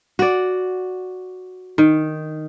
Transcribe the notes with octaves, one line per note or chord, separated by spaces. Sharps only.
F#4 D5
D#3